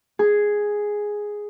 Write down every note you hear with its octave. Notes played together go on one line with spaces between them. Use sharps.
G#4